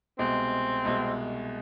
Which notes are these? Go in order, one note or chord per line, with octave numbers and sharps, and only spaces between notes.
C2 B2 G#3 C4
C2 B2 G#3